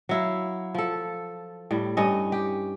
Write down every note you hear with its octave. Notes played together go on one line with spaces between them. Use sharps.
F#3 E4 F5
F3 A4
A2 G3
G2 C#4 D#5
G4